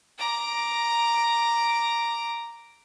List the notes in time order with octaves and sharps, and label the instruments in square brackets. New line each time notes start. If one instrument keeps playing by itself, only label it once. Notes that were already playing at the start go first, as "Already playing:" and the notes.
[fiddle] A#5 D6